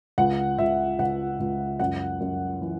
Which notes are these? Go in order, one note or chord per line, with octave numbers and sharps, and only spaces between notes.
C#2 F#5
C#2 E5
C#2 F#5
C#2
F#2 F#5
F#2
E3